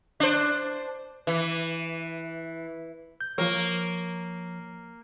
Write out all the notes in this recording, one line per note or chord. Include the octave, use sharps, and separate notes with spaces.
D4 C5
E3
G6
F3 A#3 C#5